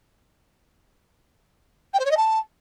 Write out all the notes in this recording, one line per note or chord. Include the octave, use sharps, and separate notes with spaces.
G5
C5
C#5
D#5
A5